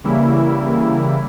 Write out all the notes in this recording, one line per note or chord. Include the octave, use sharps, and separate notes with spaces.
C#3 E3 G3 A#3 E4